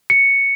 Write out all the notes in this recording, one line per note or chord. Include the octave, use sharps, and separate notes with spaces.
C#7